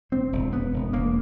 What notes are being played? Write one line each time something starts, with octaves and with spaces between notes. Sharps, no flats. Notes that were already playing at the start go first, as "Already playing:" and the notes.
E1 C4
E1
E1 B3
E1
E1 A#3